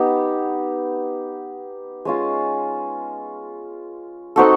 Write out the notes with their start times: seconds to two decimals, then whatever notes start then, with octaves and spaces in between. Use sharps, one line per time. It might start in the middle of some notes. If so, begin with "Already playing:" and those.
Already playing: B3 D#4 G4
2.05 G#3 C#4 F4
4.36 C4 D#4 F#4 A4